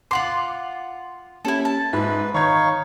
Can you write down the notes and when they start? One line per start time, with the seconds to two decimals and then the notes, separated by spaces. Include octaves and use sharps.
0.11 F4 F#5 C6 D6 F#7
1.45 A#3 C#4 E4 G4 A4
1.65 A5
1.93 G#2 B4 E5
2.34 D#3 D#4 C#5 F5 C#6 G#6